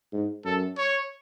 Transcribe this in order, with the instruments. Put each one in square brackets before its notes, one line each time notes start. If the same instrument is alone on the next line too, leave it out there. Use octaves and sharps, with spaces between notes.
[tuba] G#2
[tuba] F#2 [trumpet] A4
[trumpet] C#5